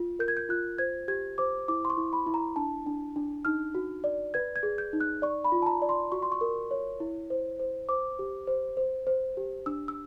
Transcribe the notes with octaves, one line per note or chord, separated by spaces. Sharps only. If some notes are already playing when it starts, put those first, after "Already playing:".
Already playing: F4
A#4 G6
G#6
G6
F4 F#6
C5 G#6
G4 G#6
C5 D6
E4 D6
C6
C#6
E4
B5
E4
A#5
D4 A5
D4
D4
D#4 F6
F#4
D5
B4 G#6
G#6
G#4
G6
D#4
F#6
D5 C#6
B5
F4
A5
A#5
D5
C6
F#4 C#6
C6
C#6
A#4
C#5
E4
C5
C5
C5 D6
G4
C5
C5
C5
G4
D4 E6
E6